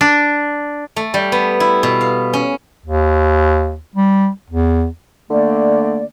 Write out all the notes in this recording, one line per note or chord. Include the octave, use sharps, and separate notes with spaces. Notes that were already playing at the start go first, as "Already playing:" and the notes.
D4
A3
G3
B3
E4
B2
F5
C#4
D#2
G3
E2
D3 A3 A#3 D5